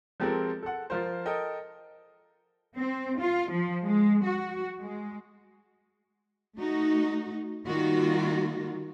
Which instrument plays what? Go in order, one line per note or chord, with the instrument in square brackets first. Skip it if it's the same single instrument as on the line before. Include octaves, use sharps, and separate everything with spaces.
[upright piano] F3 G#3 C4 G4 A4 A#4
A4 F#5
F3 F4 A#4 C5
A4 A#4 D#5 G5
[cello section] C4
F4
F3
G#3
F#4
G#3
A3 D#4 F#4
D#3 G3 A#3 F4 F#4